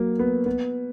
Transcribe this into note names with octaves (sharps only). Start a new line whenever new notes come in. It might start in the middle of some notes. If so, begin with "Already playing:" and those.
Already playing: F#3 A#3
B3
B3